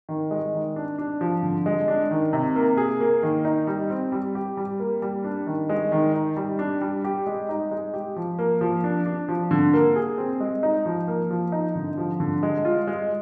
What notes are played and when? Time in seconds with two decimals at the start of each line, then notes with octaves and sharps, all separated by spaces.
0.09 D#3
0.31 G#3
0.54 D#3
0.76 D4
0.98 D4
1.21 F3
1.43 D3
1.66 G#3
1.88 D4
2.11 D#3
2.33 C3
2.56 A#3
2.77 G#4
3.00 A#3
3.23 D#3
3.45 D#4
3.67 G3
3.90 C4
4.12 G3
4.35 G4
4.57 G3
4.80 A#3
5.02 G3
5.24 D4
5.47 D#3
5.69 G#3
5.92 D#3
6.14 D#4
6.37 G3
6.59 D4
6.81 G3
7.04 G4
7.27 G#3
7.49 D#4
7.71 G#3
7.94 G4
8.16 F3
8.39 A#3
8.61 F3
8.84 D4
9.06 D4
9.29 F3
9.51 D3
9.73 A#3
9.96 G#4
10.18 C4
10.40 G#3
10.63 D#4
10.86 F3
11.08 A#3
11.30 F3
11.52 D#4
11.75 D3
11.97 F3
12.20 D3
12.43 G#3
12.65 F4
12.87 G#3